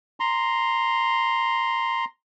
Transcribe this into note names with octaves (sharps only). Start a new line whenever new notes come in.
A#5 C6